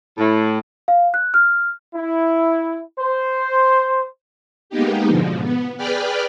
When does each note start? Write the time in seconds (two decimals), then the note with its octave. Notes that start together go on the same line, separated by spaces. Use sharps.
0.18 A2
0.88 F5
1.14 F#6
1.34 F6
1.95 E4
2.99 C5
4.70 G#3 A#3 B3 D#4 G4
5.08 G#2 B2 D3 F3
5.42 B3
5.77 G#4 B4 D5 G5 B5 F6